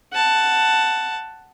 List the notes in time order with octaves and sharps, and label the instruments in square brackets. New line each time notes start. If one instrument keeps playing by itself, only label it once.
[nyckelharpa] F#5 A5